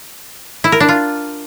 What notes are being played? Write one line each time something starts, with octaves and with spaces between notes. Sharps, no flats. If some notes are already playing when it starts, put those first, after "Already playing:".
E4
A#4
D4
F4